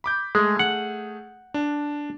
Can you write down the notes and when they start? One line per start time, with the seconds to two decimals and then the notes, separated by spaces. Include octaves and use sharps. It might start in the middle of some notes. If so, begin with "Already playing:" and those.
0.04 B5 D6 G6
0.35 G#3 A3 G#4
0.59 F#5
1.54 D4